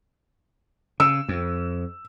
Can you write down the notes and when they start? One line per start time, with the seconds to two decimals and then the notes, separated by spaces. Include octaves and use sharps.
1.00 C#3 E6
1.28 F2